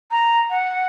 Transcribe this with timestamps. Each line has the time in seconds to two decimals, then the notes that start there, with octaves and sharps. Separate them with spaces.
0.11 A#5
0.50 F#5